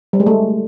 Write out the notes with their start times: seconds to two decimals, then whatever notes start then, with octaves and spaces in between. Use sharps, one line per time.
0.13 G3
0.20 G#3
0.26 A3